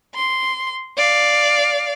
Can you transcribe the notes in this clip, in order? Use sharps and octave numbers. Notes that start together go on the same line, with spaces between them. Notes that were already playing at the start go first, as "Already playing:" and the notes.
C6
D5 F5